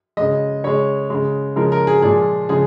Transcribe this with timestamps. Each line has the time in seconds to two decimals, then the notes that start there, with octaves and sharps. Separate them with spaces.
0.17 C#3 G#3 D#5
0.64 C#3 G#3 C#5
1.10 C#3 G#3
1.56 C#3 F3 G#3 A#4
1.72 A#4
1.87 G#4
2.02 A#2 F3 G#3 G#4
2.49 C#3 F3 G#3 G#4